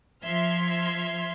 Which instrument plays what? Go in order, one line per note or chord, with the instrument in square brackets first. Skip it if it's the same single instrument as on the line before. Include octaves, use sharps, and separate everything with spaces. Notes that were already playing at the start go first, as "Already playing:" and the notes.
[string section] F3 E5 C6 F6 G#6